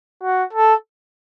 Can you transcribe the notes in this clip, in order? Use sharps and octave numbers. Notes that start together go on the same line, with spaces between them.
F#4
A4